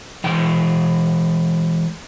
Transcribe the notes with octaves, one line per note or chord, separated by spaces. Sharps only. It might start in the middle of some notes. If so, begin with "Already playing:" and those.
E3 G#3 G5